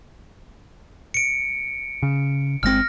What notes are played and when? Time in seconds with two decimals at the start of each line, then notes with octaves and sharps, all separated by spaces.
1.14 C#7 D7
2.03 C#3
2.63 G1 G#3 C4 F6 A#6